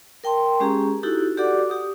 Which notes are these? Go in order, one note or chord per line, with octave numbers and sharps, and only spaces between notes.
A#4 G5 A5 C6
G#3 C#4 G4 G#4 A#5
D#4 E4 F#4 G4 A4
F#4 G4 A4 D5 F#5 D6
G4 D#6